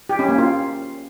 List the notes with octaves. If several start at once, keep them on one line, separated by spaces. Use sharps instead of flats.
G4
C#4
A#3
F4